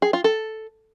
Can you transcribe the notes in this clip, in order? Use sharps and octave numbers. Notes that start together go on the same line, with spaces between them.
G#4
F4
A4